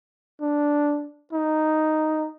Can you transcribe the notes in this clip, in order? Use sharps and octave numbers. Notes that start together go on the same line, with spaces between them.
D4
D#4